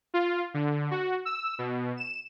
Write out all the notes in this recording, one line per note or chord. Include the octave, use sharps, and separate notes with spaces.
F4
D3
F#4
E6
B2
E7